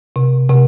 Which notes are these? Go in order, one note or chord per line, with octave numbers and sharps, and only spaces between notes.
C3
C3